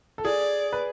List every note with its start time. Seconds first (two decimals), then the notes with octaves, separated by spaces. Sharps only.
0.18 A4
0.25 G#4 D5
0.73 B4